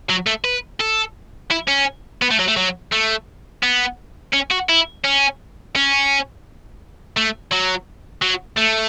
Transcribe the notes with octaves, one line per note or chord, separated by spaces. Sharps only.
F#3
A3
B4
A4
E4
C#4
B3
A3
F#3
A3
F#3
A3
B3
C#4
F#4
E4
C#4
C#4
A3
F#3
F#3
A3